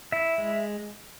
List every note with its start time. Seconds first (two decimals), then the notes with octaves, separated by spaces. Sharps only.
0.12 E4 E5
0.38 G#3